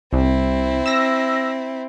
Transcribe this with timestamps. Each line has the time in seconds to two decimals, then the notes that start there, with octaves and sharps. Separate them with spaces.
0.13 C2 C4 E4
0.86 E6 A#6